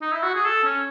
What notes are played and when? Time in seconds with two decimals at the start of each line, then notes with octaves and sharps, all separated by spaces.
0.02 D#4
0.12 E4
0.23 F#4
0.35 G#4
0.45 A4
0.64 C#4